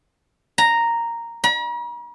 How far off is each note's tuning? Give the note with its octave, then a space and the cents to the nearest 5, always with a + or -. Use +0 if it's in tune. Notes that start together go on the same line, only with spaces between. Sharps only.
A#5 -5
A#5 +45